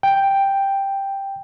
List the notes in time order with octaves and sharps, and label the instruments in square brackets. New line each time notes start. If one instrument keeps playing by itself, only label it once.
[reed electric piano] G5